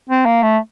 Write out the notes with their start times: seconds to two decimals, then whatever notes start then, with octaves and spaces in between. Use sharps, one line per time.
0.09 C4
0.26 A#3
0.43 A3